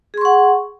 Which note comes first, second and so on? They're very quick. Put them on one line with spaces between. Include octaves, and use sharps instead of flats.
G#4 C6 C#6 F#5